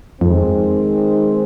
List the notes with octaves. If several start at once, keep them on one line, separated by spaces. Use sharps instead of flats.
F2 D#3 G#3 C4